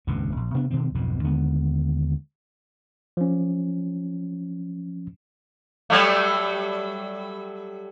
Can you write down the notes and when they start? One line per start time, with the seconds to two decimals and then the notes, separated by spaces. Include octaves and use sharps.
0.07 D#1 C#2 G2 C3
0.37 A#1
0.54 C3 B3 D4
0.70 B2 D#3 G3 C4
0.95 B1 F2 G#2 B2
1.24 D#2 D3 G#3 B3
3.17 F3 C#4
5.90 F#3 G3 A3